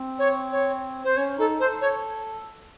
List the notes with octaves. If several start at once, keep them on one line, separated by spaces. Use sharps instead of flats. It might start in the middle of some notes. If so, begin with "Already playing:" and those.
Already playing: C4
C#5
C#5
C5
C#4 C#5
D#4 A4
A4 C5
C#5